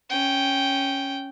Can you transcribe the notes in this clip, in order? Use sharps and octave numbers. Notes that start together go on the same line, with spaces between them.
C#4 G5